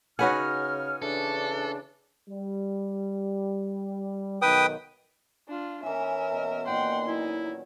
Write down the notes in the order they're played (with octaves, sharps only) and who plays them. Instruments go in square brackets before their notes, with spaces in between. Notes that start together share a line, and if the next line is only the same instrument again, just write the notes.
[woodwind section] C#3 F6 [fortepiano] D#4 C#5 G#5 [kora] F#4 B4 F#5
[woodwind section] C#3 E3 D4 [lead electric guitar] A4
[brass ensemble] G3
[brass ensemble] B1 D#3 [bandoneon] B4 G5 D#6
[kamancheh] D4 F4
[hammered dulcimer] E3 C#4 [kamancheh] A#4 E5
[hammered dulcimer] B2
[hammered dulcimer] A#2 D#3 [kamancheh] F#5 C6 [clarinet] G5
[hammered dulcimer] F#3 [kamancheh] D#4 [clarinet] E4